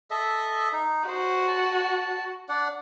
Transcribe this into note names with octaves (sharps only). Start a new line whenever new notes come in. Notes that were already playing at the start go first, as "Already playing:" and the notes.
A4 D#5 E5
D#4
F#4 C5
A5
D4 D5 F#5